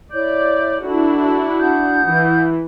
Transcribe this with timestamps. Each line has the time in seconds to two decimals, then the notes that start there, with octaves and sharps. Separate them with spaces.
0.13 E4 C#5 D5 G6
0.83 D4 E4 F#4 A4 D5
1.60 F#5 D#6 G6
2.05 E3